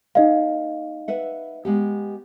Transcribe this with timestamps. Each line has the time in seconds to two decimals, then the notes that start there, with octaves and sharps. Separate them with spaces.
0.15 A#3 D#4 D#5 F5
1.08 B4 E5 F#5
1.65 G#3 B3 G4